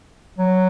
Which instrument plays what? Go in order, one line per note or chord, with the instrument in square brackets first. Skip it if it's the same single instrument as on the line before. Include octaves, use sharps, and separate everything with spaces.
[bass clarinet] F#3